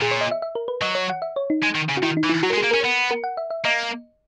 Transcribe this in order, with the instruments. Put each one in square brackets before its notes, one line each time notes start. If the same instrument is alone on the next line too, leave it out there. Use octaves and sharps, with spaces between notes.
[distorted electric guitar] A#2 [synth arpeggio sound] G#4
[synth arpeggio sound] C#5
D#5
E5
E5
A#4
B4
[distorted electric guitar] F#3 [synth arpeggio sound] D#5
[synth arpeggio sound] C#5
F#5
E5
C#5
D#4
[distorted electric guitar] G#3
D#3
C#3
[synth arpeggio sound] F#4
[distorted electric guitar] D#3 [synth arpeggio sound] E4
[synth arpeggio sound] D#4
[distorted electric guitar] E3
[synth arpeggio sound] E4
[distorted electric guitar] F#3 [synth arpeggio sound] F#4
[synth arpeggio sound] A#4
[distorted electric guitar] G#3
[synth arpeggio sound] G#4
[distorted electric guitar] A#3
[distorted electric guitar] C#4 [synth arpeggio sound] A#4
[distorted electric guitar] B3
[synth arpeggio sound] A#4
F#5
E5
E5
[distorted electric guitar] A#3 [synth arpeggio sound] D#5